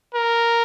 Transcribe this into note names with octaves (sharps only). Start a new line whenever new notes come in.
A#4